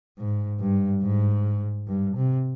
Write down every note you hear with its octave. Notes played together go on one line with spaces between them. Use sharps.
G#2
G2
G#2
G2
C3